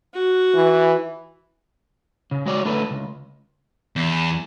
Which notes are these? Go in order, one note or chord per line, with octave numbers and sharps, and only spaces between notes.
F#4
E3
C#3
G#3 F#4 C#5 D5
D3 A3 E4 A4 B4
C#2
E2